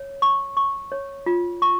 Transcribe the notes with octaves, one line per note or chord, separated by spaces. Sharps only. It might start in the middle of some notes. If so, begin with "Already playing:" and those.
Already playing: C#5
C#6
C#6
C#5
F4
C#6